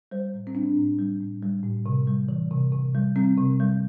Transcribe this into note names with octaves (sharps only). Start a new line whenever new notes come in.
G3 C5
A2
C4
G3 D4
A2
G3
A2
G3
A2
C3
G3
E3
C3
C3
G3
G3 C4
C3
G3